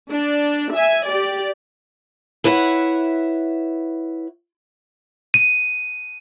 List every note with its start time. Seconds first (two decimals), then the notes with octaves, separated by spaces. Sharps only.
0.11 D4
0.73 E5 G#5
1.06 G4 D5
2.44 E4 B4 C#5 E5 F#5
5.34 D#7